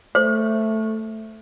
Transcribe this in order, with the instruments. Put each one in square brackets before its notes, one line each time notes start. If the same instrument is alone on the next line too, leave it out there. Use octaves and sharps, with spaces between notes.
[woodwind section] A3 [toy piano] C5